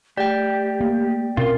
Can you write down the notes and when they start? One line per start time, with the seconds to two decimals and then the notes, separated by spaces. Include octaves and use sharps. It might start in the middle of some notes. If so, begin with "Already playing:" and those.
0.17 A3 G4 D5 G5
0.80 A#3
1.37 B2 C4 C#4 F4 A#4 C6